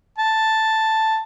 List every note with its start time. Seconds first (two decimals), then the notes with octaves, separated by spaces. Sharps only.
0.18 A5